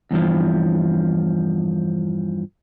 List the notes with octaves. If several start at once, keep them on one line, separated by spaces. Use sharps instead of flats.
E2 G2 E3 F3